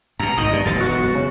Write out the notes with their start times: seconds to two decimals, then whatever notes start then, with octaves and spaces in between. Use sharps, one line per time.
0.20 F#2 B2 A#5
0.38 G#1 D#3 D#5
0.53 G2 B2
0.66 E1 B1 F#2 A6
0.80 F#4
1.15 C#3